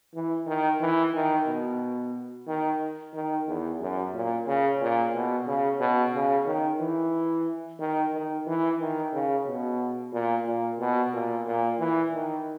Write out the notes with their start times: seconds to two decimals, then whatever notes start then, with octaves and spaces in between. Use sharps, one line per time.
0.14 E3
0.47 D#3
0.80 E3
1.14 D#3
1.47 B2
2.47 D#3
3.14 D#3
3.47 E2
3.81 F#2
4.14 A#2
4.47 C#3
4.81 A#2
5.14 B2
5.47 C#3
5.80 B2
6.13 C#3
6.46 D#3
6.80 E3
7.80 D#3
8.13 D#3
8.47 E3
8.80 D#3
9.13 C#3
9.47 B2
10.13 A#2
10.46 A#2
10.79 B2
11.13 A#2
11.46 A#2
11.79 E3
12.13 D#3